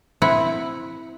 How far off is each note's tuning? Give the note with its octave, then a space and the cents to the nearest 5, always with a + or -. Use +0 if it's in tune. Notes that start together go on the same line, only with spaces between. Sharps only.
C4 +0 E4 +0 F#5 +0